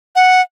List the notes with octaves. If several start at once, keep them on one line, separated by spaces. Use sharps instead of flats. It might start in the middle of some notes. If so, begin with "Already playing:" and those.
F#5